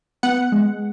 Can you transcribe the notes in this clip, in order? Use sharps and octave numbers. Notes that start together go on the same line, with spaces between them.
B3 F#5
G#3